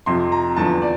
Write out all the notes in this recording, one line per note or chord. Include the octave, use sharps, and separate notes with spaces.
F2 C3 F3 C6
A#5
E2 D3 F3 A5
D5